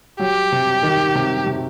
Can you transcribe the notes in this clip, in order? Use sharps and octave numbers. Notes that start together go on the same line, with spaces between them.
F#3 G4
C3
D#3
C3
C3